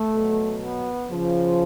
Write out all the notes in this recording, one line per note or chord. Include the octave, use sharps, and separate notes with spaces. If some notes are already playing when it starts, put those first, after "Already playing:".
Already playing: A3
B2 F#3
B3
C#3 F3